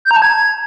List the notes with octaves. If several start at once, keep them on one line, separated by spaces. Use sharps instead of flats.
G6
A#5
A5
G#6